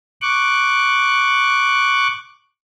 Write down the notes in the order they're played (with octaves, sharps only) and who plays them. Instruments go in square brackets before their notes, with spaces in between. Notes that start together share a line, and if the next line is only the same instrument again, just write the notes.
[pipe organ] C#6 D6 F#6